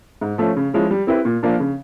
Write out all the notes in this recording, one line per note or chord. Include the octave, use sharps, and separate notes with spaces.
G#2
F3 A3 C#4
C#3
F3 G#3 C#4 E4
G3
C4 E4 G4 B4
A#2
F3 A#3 D4
C#3